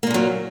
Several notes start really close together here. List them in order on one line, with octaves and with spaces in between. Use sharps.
A#3 A#2 C#3 F#3